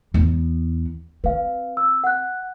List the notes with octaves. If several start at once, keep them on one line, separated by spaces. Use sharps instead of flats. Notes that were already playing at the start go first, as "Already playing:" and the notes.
E2 B3
C4 B4 F5
E6
F#5 F#6